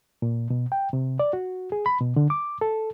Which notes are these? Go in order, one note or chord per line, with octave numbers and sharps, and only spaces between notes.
A#2
B2
G5
C3
D5
F#4
G#4
B5
B2
D3
D6
A4